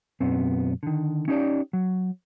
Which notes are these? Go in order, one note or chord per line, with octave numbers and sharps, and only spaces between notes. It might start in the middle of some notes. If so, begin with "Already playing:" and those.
B1 F#2 B3 C4
D3 D#3
C#4 D#4 G4 B4 D5
F#3